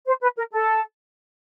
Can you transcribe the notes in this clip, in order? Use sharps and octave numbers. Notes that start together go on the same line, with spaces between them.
C5
B4
A#4
A4